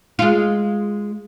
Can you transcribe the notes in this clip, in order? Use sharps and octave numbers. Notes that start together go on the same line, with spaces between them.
G#3 F4